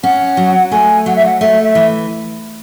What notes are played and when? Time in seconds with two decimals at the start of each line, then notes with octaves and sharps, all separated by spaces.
0.03 C#4 F#5
0.37 F#3
0.71 A3 G#5
1.06 F#3 F#5
1.16 E5
1.25 F#5
1.41 A3 E5
1.64 E5
1.75 E3